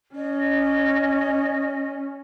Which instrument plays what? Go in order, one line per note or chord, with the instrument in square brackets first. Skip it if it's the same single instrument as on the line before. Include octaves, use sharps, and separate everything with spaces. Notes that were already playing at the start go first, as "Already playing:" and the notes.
[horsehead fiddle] C#4 [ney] D#5